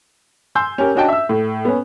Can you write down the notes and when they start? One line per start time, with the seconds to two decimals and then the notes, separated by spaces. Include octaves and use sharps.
0.55 G#5 C6 E6 G6
0.78 C#4 G4 A#4
0.95 C#4 D4 F#4 D#5 G5 A5
1.09 E5 E6
1.29 A2
1.65 B3 C#4